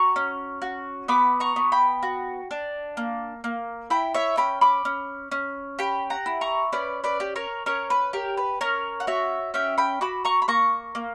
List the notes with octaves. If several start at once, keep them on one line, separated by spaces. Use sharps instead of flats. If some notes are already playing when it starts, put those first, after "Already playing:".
Already playing: F#4 A#5 C#6
C#4
F#4
B3 B5 D6
A#5 C#6
B3
G5 B5
F#4
D4
A#3
A#3
E4 G5 B5
C#5 E5
C#4 G5 B5
B5 D6
C#4
C#4
G4 G5 B5
F#5 A#5
E4
A#5 C#6
C#4 B4 D5
B4 D5
G4
A#4 C#5
C#4 A#4 C#5
B4
G4 A#4
B4
C#4 A#4 C#5
F#5
F#4 C#5 E5
C#4 E5 G5
G5 B5
F#4 B5 D6
A#5 C#6
B5
A#3 A#5 C#6
A#3